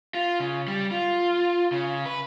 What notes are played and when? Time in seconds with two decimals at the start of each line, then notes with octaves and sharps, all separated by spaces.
0.14 F4
0.40 C#3
0.68 G3
0.91 F4
1.72 C#3
2.06 B4